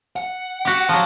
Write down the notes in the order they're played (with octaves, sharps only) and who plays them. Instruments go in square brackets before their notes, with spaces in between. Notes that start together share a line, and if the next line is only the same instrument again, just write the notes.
[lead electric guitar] F#5
[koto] F#4 G4
F3 F#3